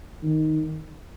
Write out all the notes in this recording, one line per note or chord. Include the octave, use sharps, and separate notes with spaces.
D#3